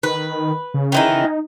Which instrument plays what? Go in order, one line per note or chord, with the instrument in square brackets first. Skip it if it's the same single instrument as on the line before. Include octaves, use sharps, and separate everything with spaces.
[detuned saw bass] D#3 [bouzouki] B4
[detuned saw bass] C#3
[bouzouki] D#3 E3 D#4
[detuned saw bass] D#4